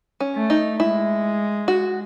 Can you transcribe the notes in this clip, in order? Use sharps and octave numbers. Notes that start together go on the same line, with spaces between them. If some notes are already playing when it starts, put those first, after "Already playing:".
C#4
A3
D#4
G#3 E4
F#4